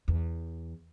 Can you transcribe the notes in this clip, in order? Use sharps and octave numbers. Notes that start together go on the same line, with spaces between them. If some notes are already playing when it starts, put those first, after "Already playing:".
E2